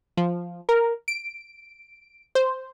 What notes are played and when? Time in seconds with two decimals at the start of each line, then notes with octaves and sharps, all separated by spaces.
0.17 F3
0.69 A#4
1.08 D7
2.35 C5